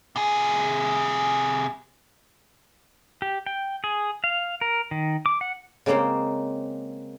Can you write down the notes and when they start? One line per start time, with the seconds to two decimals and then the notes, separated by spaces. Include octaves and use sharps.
0.16 C3 G#4
3.22 G4
3.47 G5
3.84 G#4
4.24 F5
4.61 A#4
4.91 D#3
5.26 D6
5.41 F#5
5.86 C#3 G#3 A#3 C4 C5